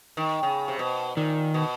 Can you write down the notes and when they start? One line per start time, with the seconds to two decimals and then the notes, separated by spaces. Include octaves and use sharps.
0.17 D#3
0.43 C#3
0.68 C3
0.79 B2
1.17 A#2 D#3
1.54 B2